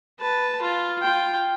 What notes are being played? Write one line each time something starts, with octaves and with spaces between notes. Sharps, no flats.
B4 A5
F4
F4 G5